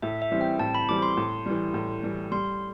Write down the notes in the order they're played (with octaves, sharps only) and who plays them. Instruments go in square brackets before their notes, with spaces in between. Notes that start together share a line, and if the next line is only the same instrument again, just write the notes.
[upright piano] A2 [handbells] E5
[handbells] E5
[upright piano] E3 G3 C4
[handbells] G5
[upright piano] A2 [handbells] A5
[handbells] B5
[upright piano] E3 G3 C4 [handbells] D6
[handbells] C6
[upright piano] A2
E3 G3
A2
E3 G3
[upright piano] G3 [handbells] C6